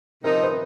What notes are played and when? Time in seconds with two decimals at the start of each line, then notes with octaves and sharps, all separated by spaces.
0.24 C3 F3 G#3 C4 D#4 A#4
0.38 A#4
0.43 B4